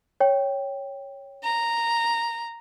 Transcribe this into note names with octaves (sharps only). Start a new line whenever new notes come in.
C#5 G5
A#5